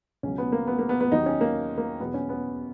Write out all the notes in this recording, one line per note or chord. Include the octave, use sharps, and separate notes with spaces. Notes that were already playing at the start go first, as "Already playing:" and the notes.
C#2 B2 F#3 C#4
B3
A#3
B3
A#3
B3
B3
D#2 D#3 F#3 D#4
C#4
A#3
A#3
E2 B2 F#3 B3
C#4
B3